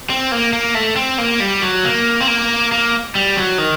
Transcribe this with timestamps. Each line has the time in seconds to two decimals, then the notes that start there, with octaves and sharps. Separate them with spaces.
0.10 C4
0.32 A#3
0.53 A#3
0.75 A3
0.96 C4
1.18 A#3
1.40 G3
1.62 F#3
1.84 A#3
2.21 C4
2.28 A#3
2.72 A#3
3.15 G3
3.36 F#3
3.58 D#3